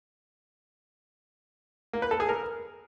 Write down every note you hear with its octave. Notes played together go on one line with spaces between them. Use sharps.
A#3
B4
A4
G#4
A#4